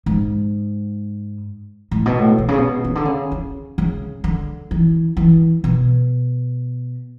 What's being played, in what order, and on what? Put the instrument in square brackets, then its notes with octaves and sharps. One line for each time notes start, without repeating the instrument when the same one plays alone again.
[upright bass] G#2
A2
B2
A2
B2
C#3
B2
C#3
D3
C#3
C#3
C#3
D3
E3
E3
B2